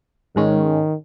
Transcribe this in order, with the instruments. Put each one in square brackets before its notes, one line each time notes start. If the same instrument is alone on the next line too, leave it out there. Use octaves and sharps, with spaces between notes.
[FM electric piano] G#2 G#3 C#4 [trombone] D#3